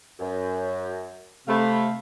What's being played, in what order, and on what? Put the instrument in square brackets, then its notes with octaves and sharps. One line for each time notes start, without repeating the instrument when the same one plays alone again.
[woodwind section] F#2
[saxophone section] C3 A3 [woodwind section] F5 B5